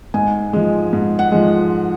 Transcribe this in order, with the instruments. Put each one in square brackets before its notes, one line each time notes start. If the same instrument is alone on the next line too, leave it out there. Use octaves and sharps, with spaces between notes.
[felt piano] G#2 G#5
F3 G#3
G#2
F#5
F3 G#3